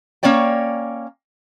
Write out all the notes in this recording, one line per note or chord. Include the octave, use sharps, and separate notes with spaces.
A#3 C#4 C#5 D5 G5